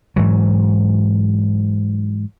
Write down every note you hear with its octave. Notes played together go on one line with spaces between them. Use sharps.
G#2 E3 F#3